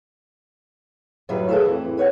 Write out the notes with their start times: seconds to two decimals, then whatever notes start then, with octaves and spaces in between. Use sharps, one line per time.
1.29 F#2 A2 D#3 F#3 G3 B4
1.49 G#4 A4 B4 C#5 E5 F5
1.64 F2 E3
1.97 B4 C#5 D#5 F#5